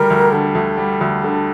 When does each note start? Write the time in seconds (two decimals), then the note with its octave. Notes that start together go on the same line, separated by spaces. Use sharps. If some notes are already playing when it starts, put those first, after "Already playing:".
Already playing: D2 G3 A#4
0.10 D2
0.32 D3
0.55 D2
0.77 G3
1.01 D2
1.24 D3